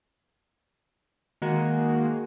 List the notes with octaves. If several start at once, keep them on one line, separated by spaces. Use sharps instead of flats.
D#3 G#3 A#3 F#4